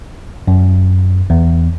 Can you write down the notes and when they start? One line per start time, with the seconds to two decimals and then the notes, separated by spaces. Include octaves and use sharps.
0.48 F#2
1.30 E2